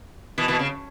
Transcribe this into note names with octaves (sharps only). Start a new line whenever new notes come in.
B2 E3
B2 E3
C#3